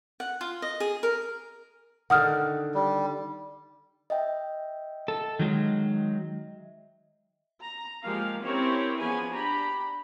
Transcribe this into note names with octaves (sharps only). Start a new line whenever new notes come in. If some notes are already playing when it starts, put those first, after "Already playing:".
F#5
F4
D#5
G#4
A#4
D3 D#3 F#5 D#6 F6
G3
D#5 E5 G5
A4
D#3 F#3 G#3
A#5
F3 G#3 A#3 G4 F5
C4 C#4 E4 G4 A#4 C#5
F3 B3 C#4 G#4 B4 G#5
D4 G4 A#5 B5